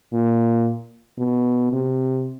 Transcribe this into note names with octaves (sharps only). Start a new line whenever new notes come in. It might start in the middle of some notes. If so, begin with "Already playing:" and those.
A#2
B2
C3